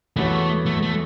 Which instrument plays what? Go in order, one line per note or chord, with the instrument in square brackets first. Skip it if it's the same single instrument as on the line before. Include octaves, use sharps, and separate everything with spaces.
[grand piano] E2 E3 B3 F#4 C#5 [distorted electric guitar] A3
[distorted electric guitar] A3
A3